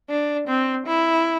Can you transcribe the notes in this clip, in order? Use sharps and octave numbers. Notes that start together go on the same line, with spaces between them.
D4
C4
E4